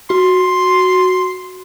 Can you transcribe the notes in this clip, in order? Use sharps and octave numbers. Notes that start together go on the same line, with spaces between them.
F#4 C6